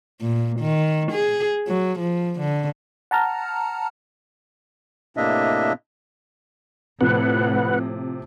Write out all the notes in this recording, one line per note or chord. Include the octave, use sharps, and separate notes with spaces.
A#2
D#3
G#4
F#3
F3
D3
F#5 A5 A#5 F6
A2 C3 A#3 D4 D#5 E5
A2 C3 F3 B4 F#5